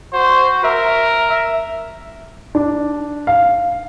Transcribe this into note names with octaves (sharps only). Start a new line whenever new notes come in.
F#4 C5
A#4 E5
E5
D4
F5